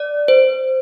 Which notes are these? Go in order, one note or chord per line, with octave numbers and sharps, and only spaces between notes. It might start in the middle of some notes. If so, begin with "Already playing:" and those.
Already playing: D5
C5